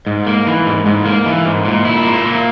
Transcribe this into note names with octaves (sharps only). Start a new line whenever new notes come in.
G#2
A#3
E3
G#2
G#2
A#3
E3
G#2
A#2
E4
A#3
A#2